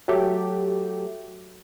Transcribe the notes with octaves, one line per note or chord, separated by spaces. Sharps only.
F#3 A3 G4